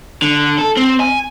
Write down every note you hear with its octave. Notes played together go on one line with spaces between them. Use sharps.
D3
A4
C4
G#5